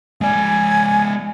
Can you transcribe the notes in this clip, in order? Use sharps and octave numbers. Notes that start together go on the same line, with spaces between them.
G#3 D5 G#5